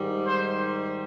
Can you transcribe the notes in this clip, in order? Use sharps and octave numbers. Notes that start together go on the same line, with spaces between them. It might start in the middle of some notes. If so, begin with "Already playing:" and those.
Already playing: G#2 D#3 G3
C5